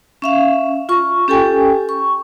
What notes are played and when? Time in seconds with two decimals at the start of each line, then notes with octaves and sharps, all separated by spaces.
0.22 C#4 E5 F5
0.89 F4 C#6
1.28 C#4 G4 A4 G5 G#5
1.89 C#6